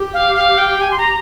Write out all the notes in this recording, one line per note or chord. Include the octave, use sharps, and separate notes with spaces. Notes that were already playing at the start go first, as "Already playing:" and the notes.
Already playing: G4
F5
F5
G5
G#5
C6
A#5